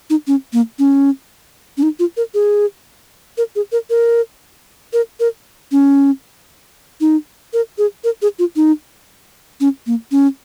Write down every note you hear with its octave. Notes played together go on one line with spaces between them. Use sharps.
D#4
C#4
A#3
C#4
C#4
D#4
F4
A#4
G#4
A#4
G#4
A#4
A#4
A#4
A#4
C#4
D#4
A#4
G#4
A#4
G#4
F4
D#4
C#4
A#3
C#4